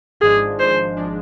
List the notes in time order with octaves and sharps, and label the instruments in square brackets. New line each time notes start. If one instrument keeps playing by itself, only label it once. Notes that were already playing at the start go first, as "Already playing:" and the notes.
[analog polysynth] G#1 G#2 F3 G#3 D4 [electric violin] G#4
[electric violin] C5
[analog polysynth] F3 G#3 D4